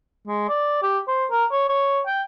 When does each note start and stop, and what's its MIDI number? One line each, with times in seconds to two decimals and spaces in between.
0.28 0.45 56
0.49 0.79 74
0.83 0.99 67
1.08 1.26 72
1.31 1.45 70
1.51 1.65 73
1.69 2.01 73
2.06 2.23 79